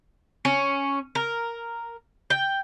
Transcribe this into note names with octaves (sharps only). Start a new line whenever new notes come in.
C#4
A#4
G5